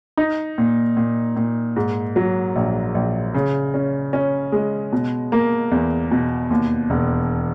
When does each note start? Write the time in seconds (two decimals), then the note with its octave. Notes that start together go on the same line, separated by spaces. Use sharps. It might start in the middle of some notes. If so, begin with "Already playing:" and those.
0.17 D#4
0.58 A#2
0.97 A#2
1.36 A#2
1.76 G#2
2.16 F#3
2.56 A#1
2.95 A#1
3.34 C#3
3.74 C#4
4.13 C#4
4.52 G#3
4.93 B2
5.32 A#3
5.71 E2
6.11 B2
6.50 D#2
6.90 E1